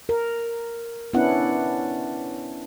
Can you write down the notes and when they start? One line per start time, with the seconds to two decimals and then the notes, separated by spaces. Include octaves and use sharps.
0.09 A#4
1.13 B3 C#4 D4 E4 F#5